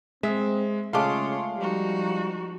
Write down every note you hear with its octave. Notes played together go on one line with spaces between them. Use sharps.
G#3 C4 E5
C#3 G#3 A3 F4 C#5 F5 C6 D6
F3 G3 D#4 F#4